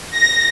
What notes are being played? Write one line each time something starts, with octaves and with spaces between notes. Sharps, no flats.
A#6